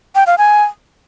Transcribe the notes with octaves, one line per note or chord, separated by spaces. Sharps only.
G5
F5
G#5